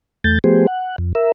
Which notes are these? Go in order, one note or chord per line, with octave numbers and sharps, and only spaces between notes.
E2 A3 G6 A6
F3 A3 B3 G4 G#4 C5
F#5
F2
A#4 E5